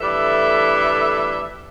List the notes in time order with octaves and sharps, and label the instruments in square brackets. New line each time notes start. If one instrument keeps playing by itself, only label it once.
[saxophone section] D2 E3 G3 A4 E5